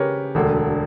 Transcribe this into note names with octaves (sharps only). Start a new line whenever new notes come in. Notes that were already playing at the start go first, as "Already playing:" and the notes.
Already playing: C#3 G4 A#4 B4 C#5
E1 D2 D3